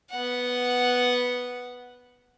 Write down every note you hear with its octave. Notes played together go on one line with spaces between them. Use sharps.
B3 F#5